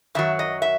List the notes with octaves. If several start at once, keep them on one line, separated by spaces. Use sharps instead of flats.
F#2 D#3 F#3 E5
D#5
E5